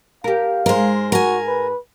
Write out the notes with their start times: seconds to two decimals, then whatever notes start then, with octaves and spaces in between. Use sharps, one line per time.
0.24 G4 A#4 F5
0.66 G#2 G#3 A#4 C5
1.12 F#4 A#4 G#5
1.47 B4